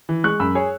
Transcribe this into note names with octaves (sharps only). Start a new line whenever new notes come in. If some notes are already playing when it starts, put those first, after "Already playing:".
E3
G#3 C#6 F#6
F#2 B5 E6
G#4 C#5